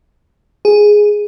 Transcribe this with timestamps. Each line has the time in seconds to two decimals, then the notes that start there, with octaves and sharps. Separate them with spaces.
0.65 G#4